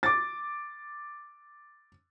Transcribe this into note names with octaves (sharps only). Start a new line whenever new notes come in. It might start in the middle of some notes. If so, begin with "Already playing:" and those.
D6 A6